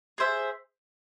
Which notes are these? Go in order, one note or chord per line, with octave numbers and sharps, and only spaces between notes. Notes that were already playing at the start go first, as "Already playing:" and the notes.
G#4 C5 E5